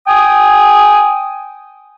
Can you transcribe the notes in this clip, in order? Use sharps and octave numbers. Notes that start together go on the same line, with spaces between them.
G5 G#5 D#6